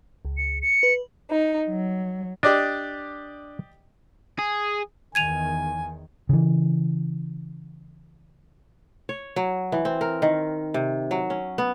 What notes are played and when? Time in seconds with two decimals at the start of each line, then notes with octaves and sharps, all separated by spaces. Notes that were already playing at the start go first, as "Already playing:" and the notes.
0.25 C#2
0.37 C#7
0.62 C#7
0.83 B4
1.31 D#4
1.69 F#3
2.43 D4 G4 D5 D#5
4.39 G#4
5.15 E2 D#3 G#5 G#6 D#7 F7
6.29 C#3 E3
9.09 C#5
9.36 F#3
9.72 E3
9.85 C4
10.01 A#4
10.22 D#3
10.74 C3
11.11 F#3
11.30 C#4
11.58 B3